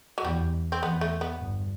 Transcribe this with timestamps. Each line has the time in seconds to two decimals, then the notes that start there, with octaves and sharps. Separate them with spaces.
0.18 F#3
0.24 E2 G3
0.72 C4
0.83 E2 B3
1.01 A3
1.21 B3
1.40 G1 G2